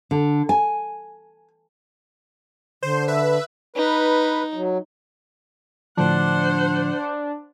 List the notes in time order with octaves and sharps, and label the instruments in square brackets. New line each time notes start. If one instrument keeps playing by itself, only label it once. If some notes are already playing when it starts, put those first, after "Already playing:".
[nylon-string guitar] D3
G#5
[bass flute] D3 [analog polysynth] C5
[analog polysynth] B4 E5
[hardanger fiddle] D#4 [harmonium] B4
[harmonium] F#3
[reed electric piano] A2 D3 F3 [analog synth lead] D4 [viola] C5 F#5